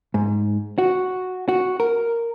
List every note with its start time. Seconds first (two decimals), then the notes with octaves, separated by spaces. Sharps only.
0.14 G#2
0.78 F#4
1.49 F#4
1.80 A#4